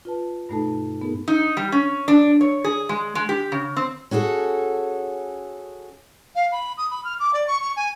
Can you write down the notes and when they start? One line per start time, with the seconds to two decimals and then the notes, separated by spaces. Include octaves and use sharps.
0.05 F4 B4 A5
0.49 G2 B2 A3 D#4 A4 A5
1.02 B3 D#4 G#4 A#4
1.28 D#4
1.57 G3
1.72 C#4
2.08 D4
2.41 C#5
2.64 G#4
2.89 G#3
3.15 G#3
3.29 G4
3.52 C#3
3.77 C4
4.11 C#4 F#4 G#4 A4
6.35 F5
6.52 B5
6.77 D#6
6.91 B5
7.04 F6
7.19 D6
7.33 D5
7.47 C#6
7.61 C#6
7.76 G#5